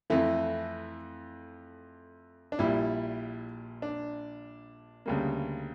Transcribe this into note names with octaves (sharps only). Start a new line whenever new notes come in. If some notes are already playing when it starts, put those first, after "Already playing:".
F2 E3 A3 E4
D4
A#1 A#2 G3 E4
D4
D2 C#3 G3 A#3